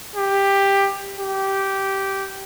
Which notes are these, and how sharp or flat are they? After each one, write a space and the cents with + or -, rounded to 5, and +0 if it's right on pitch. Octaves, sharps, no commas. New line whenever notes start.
G4 +10
G4 -10